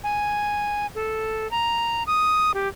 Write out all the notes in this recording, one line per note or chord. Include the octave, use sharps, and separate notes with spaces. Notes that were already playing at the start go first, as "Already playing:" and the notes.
G#5
A4
A#5
D#6
G4